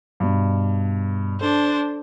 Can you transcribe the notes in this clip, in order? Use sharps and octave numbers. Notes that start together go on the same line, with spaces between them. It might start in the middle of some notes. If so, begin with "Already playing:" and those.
G2 B2
D4 A4 C5